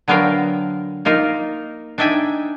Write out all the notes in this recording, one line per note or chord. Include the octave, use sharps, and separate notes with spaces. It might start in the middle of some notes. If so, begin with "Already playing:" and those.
D3 F#3 B3 A#4 F5 G5
A#3 D#4 F4 A#4
D4 D#4 D5 E5 G5 G#5